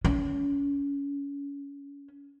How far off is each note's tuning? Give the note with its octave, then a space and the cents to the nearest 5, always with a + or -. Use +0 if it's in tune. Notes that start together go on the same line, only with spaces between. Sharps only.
C#4 +25